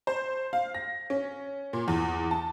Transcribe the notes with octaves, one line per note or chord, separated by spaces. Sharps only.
C5
F5
A#6
C#4
A#2
E2
A5